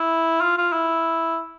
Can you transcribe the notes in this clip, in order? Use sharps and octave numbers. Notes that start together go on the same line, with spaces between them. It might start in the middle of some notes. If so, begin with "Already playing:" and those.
Already playing: E4
F4
F4
E4